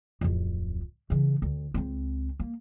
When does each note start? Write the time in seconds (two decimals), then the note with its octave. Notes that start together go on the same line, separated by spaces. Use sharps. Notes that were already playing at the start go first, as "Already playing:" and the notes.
0.21 D1 F2
1.10 C#3 E3
1.42 D2
1.74 C#2 C4
2.40 A#3